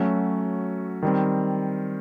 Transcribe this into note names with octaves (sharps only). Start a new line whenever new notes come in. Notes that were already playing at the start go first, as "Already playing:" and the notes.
Already playing: F#3 A3 C#4 F#4
D#3 G3 C4